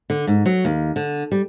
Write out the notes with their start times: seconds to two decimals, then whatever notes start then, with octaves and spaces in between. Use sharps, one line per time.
0.10 D3
0.27 G#2
0.46 F#3
0.65 D#2
0.96 D3
1.32 G3